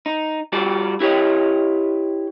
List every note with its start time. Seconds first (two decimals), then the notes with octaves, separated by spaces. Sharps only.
0.06 D#4
0.52 G3 F4 F#4 D5
1.00 E4 G4 B4 C#5 D#5